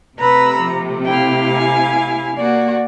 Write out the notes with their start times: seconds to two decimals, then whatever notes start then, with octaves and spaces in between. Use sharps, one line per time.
0.19 C3 A3 B4 A#5 B5 E6
0.59 F3
1.05 E4 F5 G5
1.56 G#5
2.37 A#3 F#4 D5